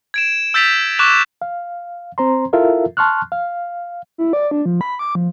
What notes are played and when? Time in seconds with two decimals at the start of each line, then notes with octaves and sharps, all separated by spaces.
0.14 G#6 D7 E7
0.54 E6 G6 A6 B6 D7 F7
0.99 C#6 D6 F#6 E7 F7
1.42 F5
2.18 C4 C5 A#5 C6
2.53 E4 F4 A4 A#4 E5 F5
2.97 A5 C6 C#6 F6 F#6
3.32 F5
4.18 E4
4.33 D5
4.51 D4
4.66 F3
4.81 B5
4.99 D6
5.15 F3